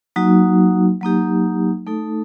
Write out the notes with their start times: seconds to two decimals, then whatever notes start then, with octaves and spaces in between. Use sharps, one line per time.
0.16 F#3 A#3 D#4 F#4
1.01 F#3 A#3 D#4 G4
1.87 A3 D#4 A4